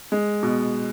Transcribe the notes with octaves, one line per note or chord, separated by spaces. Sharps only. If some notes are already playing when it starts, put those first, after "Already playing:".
G#3
B2